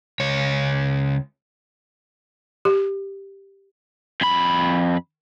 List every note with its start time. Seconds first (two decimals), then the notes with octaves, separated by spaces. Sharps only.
0.20 C#2 C#5
2.65 G4
4.21 F2 B5